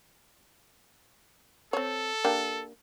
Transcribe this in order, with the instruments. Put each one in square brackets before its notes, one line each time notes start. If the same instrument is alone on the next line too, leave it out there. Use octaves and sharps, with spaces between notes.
[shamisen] C4 C#5 [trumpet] A4
[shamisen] A#3 D4 G4